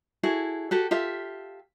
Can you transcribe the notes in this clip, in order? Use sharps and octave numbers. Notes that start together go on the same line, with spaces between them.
E4 F#4 G#4 A4
F#4 G4 A4
F4 G4 A4 E5